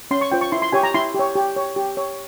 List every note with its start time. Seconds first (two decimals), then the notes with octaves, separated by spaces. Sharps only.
0.11 C#4 C6
0.21 C#6
0.31 F4 C5 G5
0.41 C#6
0.52 E4 C6
0.62 C6
0.72 G4 C#5 G#5
0.83 A#5
0.94 E4 C6
1.15 G4 C#5
1.36 G4
1.56 C#5
1.76 G4
1.97 C#5